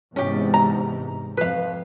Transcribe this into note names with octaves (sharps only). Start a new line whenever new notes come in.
E2 G#2 C3 C#4 G4
A#5
F2 B4 F5